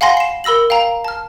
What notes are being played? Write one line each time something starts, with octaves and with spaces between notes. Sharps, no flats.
F5 F#5 G#5 B5 C6 A#6
C7 E7
A#4 B5 E6 A#6 F#7
F5 G5 A#5
A5 F6